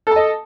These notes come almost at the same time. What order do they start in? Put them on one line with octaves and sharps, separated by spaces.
A4 A5 D#5